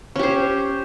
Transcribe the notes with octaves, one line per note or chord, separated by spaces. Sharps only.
C#4 G4 C5